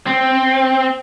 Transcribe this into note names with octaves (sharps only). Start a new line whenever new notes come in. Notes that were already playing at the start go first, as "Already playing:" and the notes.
C4